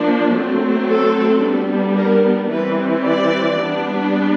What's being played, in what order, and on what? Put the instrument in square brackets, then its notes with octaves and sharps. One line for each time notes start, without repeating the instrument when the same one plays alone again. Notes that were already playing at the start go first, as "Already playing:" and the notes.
Already playing: [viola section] F3 A#3 D4
F#3 A3 C4
A4
G3 B3 D4
A#4
E3 G3 C4 B4
D5
G3 B3 D4